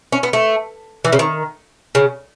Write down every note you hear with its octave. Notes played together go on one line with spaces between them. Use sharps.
C#4
B3
A3
E3
C#3
D#3
C#3